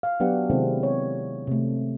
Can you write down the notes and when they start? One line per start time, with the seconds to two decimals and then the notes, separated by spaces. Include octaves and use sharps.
0.03 F5
0.20 F#3 B3 D4 G4 F#5
0.50 C3 D#3 G#3 C4 E4 A4
0.83 C#5
1.47 C3 A3